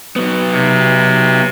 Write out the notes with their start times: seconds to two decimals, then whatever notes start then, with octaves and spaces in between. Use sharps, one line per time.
0.16 F#3 B3
0.51 C3